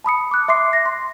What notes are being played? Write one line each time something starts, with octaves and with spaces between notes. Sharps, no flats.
A5 B5 D#6 C#7
D6 F#6
E5 C6 D6 C7
A#6
C6